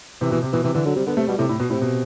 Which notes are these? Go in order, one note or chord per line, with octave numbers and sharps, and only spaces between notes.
C3 E3
B2 E3
C3
B2 E3
C3 E3
D3 E3
D3 F#3
C3 G3
D3 B3
C3 A3
B2 G3
A2 C3
A2
B2
A2 C3
B2